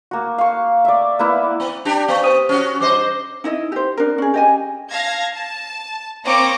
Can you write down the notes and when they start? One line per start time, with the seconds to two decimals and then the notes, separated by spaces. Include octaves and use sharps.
0.11 A#3 F#4
0.38 F5 C#6
0.85 D5 E5
1.19 A#3 B3 E4 F#5
1.60 B3
1.85 D4 G4
2.08 B3 F5 C#6
2.23 C5 D#6 D#7
2.49 C#4 F#4
2.80 G2 C5 D#5 D6
3.44 D#4 E4 D#5
3.72 G4 C5
3.97 D4 A#4
4.18 C#4 G#4
4.34 G4 D#5 G#5
4.92 F5 A5 G#6 A#6
5.33 A5
6.25 A#3 C4 C#5 D6 A#6 C#7